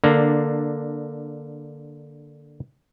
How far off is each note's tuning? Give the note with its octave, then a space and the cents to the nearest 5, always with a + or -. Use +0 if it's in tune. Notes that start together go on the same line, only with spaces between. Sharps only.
D3 +0 A#3 +0 D4 +20